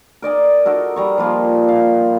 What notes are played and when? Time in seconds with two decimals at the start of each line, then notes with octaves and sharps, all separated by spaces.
0.22 A#4 D5 D#5 G#5
0.65 D#4 F#4 A4 A#4
0.96 G3 A#5 C#6
1.18 F3 G3 A#3 F4
1.68 F5